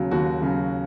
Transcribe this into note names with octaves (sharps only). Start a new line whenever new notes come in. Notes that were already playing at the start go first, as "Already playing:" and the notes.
Already playing: D#2 C#3 F#3
D#2 F#4
C#3 F#3